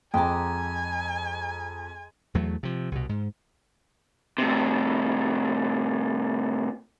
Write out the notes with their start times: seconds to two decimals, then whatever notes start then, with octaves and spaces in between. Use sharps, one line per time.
0.14 F2 G#3 G5 G#5 A#5 D6
2.35 E2 F#3 A3
2.63 C3 F3
2.92 C2 B2
3.09 G#2
4.38 A2 C3